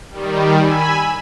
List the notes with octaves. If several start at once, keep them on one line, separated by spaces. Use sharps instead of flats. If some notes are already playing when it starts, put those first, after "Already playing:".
D#3 G3
G#5 B5 E6